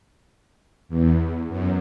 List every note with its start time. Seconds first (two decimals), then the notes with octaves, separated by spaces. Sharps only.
0.89 E2
1.49 F#2